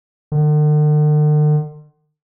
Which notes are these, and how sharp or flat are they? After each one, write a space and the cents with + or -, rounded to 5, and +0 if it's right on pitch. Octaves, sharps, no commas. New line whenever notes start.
D3 +45